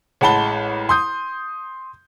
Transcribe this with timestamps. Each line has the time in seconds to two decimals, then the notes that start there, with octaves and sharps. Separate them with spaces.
0.21 A1 G#3 F#5 A5 B5 G7
0.89 C6 D#6 G6